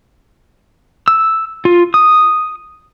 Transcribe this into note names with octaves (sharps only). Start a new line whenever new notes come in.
E6
F4
D#6